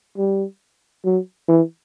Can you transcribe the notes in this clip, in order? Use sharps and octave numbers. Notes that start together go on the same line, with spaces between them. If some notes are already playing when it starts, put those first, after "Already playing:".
G3
F#3
E3